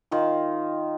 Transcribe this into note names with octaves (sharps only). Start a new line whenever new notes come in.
D#3 D#4 F4